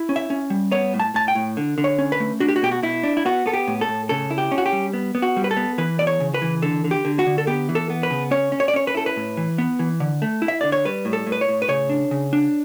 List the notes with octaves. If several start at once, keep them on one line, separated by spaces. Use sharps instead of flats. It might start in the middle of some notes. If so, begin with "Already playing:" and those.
Already playing: E4
C#4
E5
C#4
G3
B3 C#5
A2
A5
A2 A5
G5
A2
D3
D3
C#5
C#4
B4
A3
D4 F#4
G4
F#4
B2 G4
F#4
B2 E4
D4
E4
B3 F#4
B3 A4
G4
A2
A4
A2
C#3 A4
E4
G4
C#4
F#4
G4
G3
B3
B3
F#4
G3
B4
A4
B3
E3 B4
E2 D5
C#5
C#3
B4
E3
D3 A4
D3
G4
D3
F#4
D3
A4
B3 G4
E3
A4
B3
B4
C#3
C#4 C#5
C#4
C#5
D5
C#4 C#5
B4
E4 A4
B4
A2
E3
B3
E3
D3
A3
E4
E5
D3 D5
C#5
G3 B4
A2
A4
A2
B4
C#5
A2
B4
C#3 C#5
D4
C#3
D4